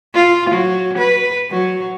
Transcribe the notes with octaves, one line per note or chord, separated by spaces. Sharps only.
F4
F#3
B4
F#3